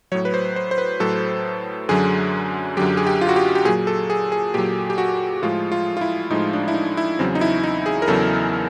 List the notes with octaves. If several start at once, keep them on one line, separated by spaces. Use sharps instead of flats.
A2 F#3 C#5
B4
C5
C5
C5
B4
A2 F#3 A4
F#2 D3 F#3 G#4
F#2 D3 F#3 G4
G#4
G4
F4
F#4
G4
G4
A#2 F#3 G#4
A4
G#4
G#4
A#2 F#3 G4
G4
F#4
A2 F3 G#3 F4
F4
F4
E4
A2 F3 G#3 D#4
D4
E4
D#4
E4
E2 C#3 F#3 C4
D#4
E4
D#4
G#4
A#4
E2 C#3 F#3 A4